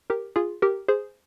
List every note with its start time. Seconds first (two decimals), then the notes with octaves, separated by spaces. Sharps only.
0.10 G4 A#4
0.36 F4 G#4
0.62 G4 A#4
0.88 G#4 C5